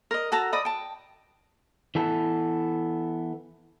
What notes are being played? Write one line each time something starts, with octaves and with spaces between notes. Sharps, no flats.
A#4 D#5
F#4 A4 A5 A#5
D5 D#5 B5 D#6
G5 A5
E3 B3 A4